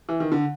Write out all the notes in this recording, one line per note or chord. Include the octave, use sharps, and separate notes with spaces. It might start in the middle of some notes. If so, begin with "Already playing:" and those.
E3
D#3
D3